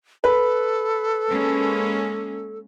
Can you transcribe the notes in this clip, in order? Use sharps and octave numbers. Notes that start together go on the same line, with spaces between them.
A4 B4
G#3 A#3 C#4